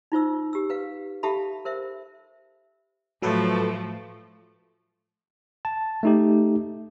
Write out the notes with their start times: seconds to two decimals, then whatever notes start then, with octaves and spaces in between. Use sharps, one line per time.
0.12 D#4 F4 C5 E6
0.53 G4 E6
0.70 B4 F5
1.23 G4 A4 E5 F5 A5 B5
1.65 A#4 C5 E5
3.22 A2 F3 F#3 A3 A4 B4
5.65 A5
6.03 A3 D#4 G4